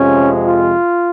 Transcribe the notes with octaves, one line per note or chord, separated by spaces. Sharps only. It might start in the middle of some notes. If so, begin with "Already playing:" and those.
Already playing: F2 C3 F3 G#3 C#4
F4